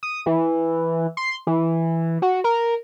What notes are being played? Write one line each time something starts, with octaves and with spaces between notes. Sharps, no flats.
D#6
E3
C6
E3
F#4
A#4